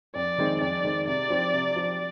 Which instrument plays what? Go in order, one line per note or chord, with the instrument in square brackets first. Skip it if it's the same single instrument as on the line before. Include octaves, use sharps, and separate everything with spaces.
[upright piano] F2 [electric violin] D5
[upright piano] D#3 G#3 C4
[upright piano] F2 [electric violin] D5
[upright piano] D#3 G#3 C4
[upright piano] C3 [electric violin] D5
[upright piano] F3 C4 G4
C3
F3 C4 G4